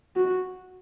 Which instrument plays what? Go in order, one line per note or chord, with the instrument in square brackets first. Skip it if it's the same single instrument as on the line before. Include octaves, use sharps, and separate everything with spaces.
[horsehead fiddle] F#4